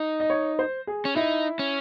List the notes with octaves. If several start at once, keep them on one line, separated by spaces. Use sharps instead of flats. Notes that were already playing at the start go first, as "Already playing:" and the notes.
Already playing: D#4
D#5
C#5
C5
G#4
C#4
D#4 E4
C#4